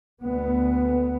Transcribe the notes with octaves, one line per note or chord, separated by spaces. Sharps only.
D2 B3